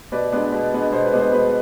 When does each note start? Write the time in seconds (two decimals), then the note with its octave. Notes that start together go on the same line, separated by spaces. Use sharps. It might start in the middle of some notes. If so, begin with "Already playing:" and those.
0.12 B2 B4 D5
0.32 G#3 B3 D4
0.52 B2
0.73 G#3 B3 D4
0.92 B2 C5
1.06 B4
1.13 G#3 B3 D4
1.19 C5
1.33 B2 B4